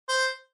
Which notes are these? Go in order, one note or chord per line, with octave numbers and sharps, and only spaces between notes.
C5